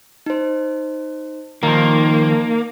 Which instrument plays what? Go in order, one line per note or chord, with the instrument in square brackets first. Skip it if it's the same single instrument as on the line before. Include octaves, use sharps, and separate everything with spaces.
[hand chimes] D#4 C5
[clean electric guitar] D#3 F3 [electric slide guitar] A#3 [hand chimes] D#4 A#5